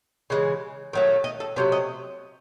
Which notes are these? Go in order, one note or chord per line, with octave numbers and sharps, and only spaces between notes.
C#3 E3 G#3
D#3 F#3 A3
D#5
A4
C3 F#3 A3 C5
D#5